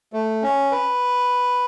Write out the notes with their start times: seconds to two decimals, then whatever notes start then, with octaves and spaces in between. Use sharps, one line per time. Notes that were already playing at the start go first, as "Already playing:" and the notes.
0.13 A3
0.43 C#4
0.72 B4